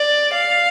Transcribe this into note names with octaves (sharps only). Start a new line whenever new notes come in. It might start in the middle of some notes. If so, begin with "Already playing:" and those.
Already playing: D5
F5